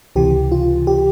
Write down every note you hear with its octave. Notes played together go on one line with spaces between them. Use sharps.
C#2 C3 E3 G4
F4
G4